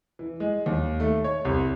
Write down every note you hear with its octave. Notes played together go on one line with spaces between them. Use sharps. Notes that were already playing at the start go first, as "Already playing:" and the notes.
E3
G#3
D#2
A3
C#5
C2